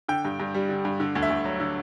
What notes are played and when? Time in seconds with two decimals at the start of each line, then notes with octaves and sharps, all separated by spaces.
0.09 D3 G5
0.25 G2
0.40 G2
0.54 G3
0.69 D3
0.85 G2
1.00 D3
1.15 D2
1.23 E5
1.30 D2
1.45 F#3
1.60 D3